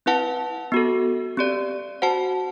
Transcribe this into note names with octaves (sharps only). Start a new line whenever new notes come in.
C4 E4 B4 F#5 A5
B3 F#4 A4
C4 G4 D5
F#4 C5 F#5 A5